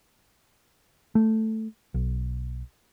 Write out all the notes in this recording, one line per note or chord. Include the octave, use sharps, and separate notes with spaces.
A3
B1